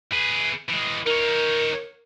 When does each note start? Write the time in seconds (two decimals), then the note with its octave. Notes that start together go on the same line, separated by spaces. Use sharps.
0.12 G#4 B4
0.70 E3 G#3
1.06 D#4 A#4 C#5